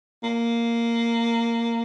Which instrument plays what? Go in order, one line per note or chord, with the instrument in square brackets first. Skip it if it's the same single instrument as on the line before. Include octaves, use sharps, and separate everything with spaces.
[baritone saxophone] A#3